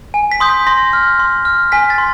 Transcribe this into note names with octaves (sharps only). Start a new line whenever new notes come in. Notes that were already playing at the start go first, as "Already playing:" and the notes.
G#5
B6
C6 D#6 G6
B6
C6 A#6
F6
C6
F6
G#5 B6
A6
C6